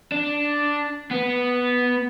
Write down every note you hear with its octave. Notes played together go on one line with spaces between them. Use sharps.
D4
B3